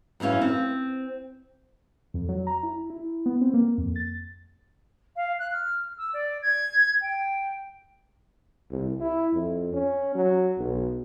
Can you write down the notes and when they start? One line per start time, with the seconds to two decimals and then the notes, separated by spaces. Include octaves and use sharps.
0.20 F#2 E3 F3 C#4 F5
0.41 C4
2.14 F2
2.29 F#3
2.47 A#5
2.63 E4
2.90 E4
3.26 B3
3.41 C4
3.54 A#3
3.78 F2
3.96 A6
5.17 F5
5.39 F#6
5.52 F6
5.98 E6
6.13 D5
6.42 G#6
7.01 G5
8.71 C2
9.00 E4
9.33 F2
9.73 C#4
10.15 F#3
10.59 B1